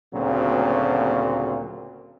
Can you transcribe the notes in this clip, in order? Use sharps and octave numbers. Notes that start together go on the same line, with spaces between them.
D2 A#2 C#3 F#3 A#3 C4